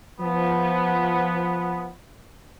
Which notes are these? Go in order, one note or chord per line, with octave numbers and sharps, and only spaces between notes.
F3 B3